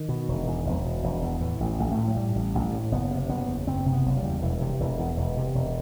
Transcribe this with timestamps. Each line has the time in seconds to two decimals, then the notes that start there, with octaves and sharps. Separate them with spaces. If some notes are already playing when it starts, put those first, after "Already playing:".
Already playing: D#3
0.09 B2
0.28 E1
0.47 E2
0.66 E1
0.85 B2
1.03 E1
1.23 E2
1.41 A2 E3
1.60 A1
1.79 A1
1.92 A3
1.97 A2
2.08 F#3
2.16 A2 G3
2.36 A1
2.55 A1
2.73 A2
2.92 F#1 B3
3.11 C3
3.29 F#1 B3
3.48 E2
3.67 F#1 C4
3.86 C3
3.92 B3
4.05 F#1
4.17 G3
4.24 E2
4.42 E1 E3
4.61 C3
4.80 E1 E3
4.99 E2
5.17 E1
5.37 C3
5.55 E1